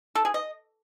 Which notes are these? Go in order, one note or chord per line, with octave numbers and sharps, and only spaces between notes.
A4
G#4
D#5